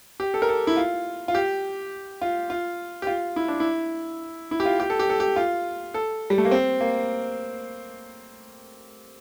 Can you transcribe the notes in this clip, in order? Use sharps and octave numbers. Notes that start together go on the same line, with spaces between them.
G4
A4
A#4
A4
E4
F4
F4
G4
F4
F4
G4
F4
E4
D4
E4
E4
G4
F4
G4
A4
G4
A4
G4
F4
A4
G3
A3
A#3
C4
A#3